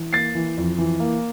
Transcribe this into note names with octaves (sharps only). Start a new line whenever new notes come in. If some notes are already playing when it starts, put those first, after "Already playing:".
Already playing: E3
A#3 A6 C7
E3
F2
E3
A#3